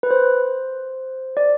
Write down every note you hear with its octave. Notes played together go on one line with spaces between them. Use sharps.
B4
C5
D5